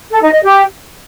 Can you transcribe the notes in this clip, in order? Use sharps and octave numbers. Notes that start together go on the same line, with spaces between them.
A4
D#4
D#5
G4